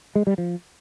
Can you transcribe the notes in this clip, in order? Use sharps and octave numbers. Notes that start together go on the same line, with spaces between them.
G#3
G3
F3